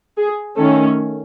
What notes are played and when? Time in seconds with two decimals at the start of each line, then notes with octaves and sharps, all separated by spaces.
0.17 G#4
0.56 D#3 A3 C#4 A4